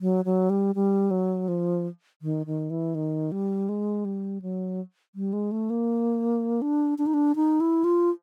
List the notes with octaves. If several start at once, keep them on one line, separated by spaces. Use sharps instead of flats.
F#3
F#3
G3
G3
F#3
F3
D#3
D#3
E3
D#3
G3
G#3
G3
F#3
G3
G#3
A3
A#3
D4
D4
D#4
D4
D#4
E4
F4